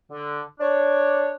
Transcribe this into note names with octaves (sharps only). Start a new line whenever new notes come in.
D3
D4 C#5